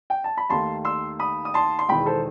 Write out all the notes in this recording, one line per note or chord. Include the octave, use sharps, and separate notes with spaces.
G5
A5
B5
D#2 D#3 A3 A5 C6
C6 E6
B5 D#6
D#6
A5 C6
C6
E1 E2 D#3 G5 B5
A4 C5